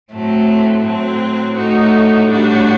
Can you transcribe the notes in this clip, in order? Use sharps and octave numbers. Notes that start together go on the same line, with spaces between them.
A2 F#3 A3 C4
A2 F#3 C4
A2 A3 D#4 F#4
A2 G3 D4 F#4